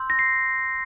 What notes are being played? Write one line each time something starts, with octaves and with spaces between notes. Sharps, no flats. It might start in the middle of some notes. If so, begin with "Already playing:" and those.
Already playing: C6 E6 G6
A#6
C7